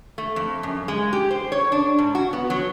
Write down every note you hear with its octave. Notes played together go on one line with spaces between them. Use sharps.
A3
F2
F#2
G#3
G4
C5
C#5
D4
G#2
F#4
B3
F#3